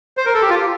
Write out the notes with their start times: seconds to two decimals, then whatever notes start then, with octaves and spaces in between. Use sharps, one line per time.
0.17 C5
0.26 A#4
0.34 A4
0.42 G4
0.50 F4